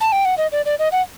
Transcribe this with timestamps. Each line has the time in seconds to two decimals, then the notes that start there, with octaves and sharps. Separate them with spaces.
0.01 A5
0.12 G5
0.25 F#5
0.38 D#5
0.52 D5
0.66 D5
0.79 D#5
0.92 F#5